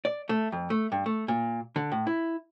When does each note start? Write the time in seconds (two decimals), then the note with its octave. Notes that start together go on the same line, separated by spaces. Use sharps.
0.05 D5
0.29 A3
0.52 F2
0.70 A3
0.92 G2
1.06 A3
1.28 A#2
1.76 D3
1.92 A2
2.07 E4